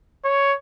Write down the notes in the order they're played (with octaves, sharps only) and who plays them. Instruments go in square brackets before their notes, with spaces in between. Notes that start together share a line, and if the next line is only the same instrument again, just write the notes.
[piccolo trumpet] C#5